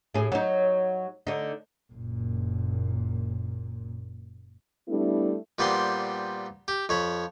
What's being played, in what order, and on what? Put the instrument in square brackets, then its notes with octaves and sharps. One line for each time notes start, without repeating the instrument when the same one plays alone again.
[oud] A2 G#4
F#3 D#4
D3 D#4
[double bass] F#1 A#2
[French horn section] G3 A3 B3 D4 E4
[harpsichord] A#2 G3 B3 C4 C6
G4
F2 C#5 B5